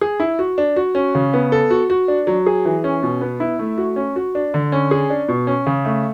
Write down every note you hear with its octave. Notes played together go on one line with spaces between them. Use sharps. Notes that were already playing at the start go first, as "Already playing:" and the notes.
G#4
E4
F#4
D4
F#4
C#4
C#3
B3
A4
F#4
F#4
D4
F#3
G#4
E3
C#4
B2
B3
E4
A3
F#4
C#4
F#4
D4
D3
C#4
G#4
D4
B2
C#4
C#3
A3